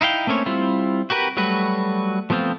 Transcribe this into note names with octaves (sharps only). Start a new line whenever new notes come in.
D#4 E4 F5 G5
A3 A#3 C4 C#4 C#5
G3 C4 E4 F4
F#4 G4 A#4 B4
F#3 G3 A3 F#4 B4
F3 A3 B3 C4 F4